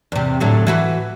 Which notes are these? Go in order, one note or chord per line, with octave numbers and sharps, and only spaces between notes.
E2 C3
A2 D3 F#3
E3 F#4 B4